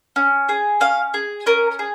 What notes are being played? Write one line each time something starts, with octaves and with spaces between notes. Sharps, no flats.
C#4
G#4
C#4 F5
G#4
C#4 A#4
G#4